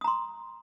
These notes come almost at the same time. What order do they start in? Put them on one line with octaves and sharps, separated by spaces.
D#6 A#5 C6